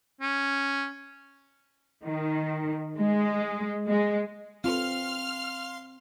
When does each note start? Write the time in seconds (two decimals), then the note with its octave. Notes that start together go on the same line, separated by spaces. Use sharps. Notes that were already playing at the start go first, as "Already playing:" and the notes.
0.21 C#4
2.04 D#3
2.98 G#3
3.87 G#3
4.64 C4 F4 A4 B4 F5 C6 F6